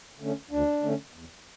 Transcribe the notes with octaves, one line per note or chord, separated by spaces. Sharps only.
D3 A3 C#4
D2 D4
D3 A3 C#4
E2